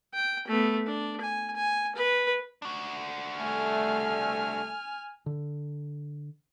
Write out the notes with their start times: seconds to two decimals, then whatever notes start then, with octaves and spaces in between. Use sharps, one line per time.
0.14 G5
0.48 A3 B3
0.86 D4
1.20 G#5
1.56 G#5
1.95 B4
2.62 D4 F#4
3.37 C2 A3 G#5 F6
5.26 D3